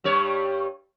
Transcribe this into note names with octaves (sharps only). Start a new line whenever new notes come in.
G2 G3 C#5